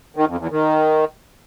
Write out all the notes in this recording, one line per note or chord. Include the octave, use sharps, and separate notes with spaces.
D#3
F2
E2
D#3